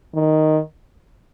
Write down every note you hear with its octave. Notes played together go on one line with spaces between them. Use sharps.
D#3